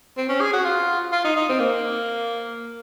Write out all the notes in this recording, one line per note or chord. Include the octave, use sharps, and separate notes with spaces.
C4
C#4
G#4
F#4
F4
F4
D#4
D#4
C4
A#3